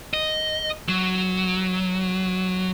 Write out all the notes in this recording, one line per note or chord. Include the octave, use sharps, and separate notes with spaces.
D#5
F#3